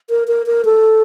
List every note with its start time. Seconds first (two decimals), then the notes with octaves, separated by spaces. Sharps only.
0.10 A#4
0.28 A#4
0.46 A#4
0.65 A4